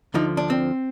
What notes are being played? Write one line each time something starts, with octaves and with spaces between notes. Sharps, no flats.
D2 D3 F3 D#4
D4
C4